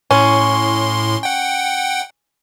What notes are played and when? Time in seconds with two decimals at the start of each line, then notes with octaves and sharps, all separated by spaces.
0.11 A2 C#4 C6
1.23 F#5 G5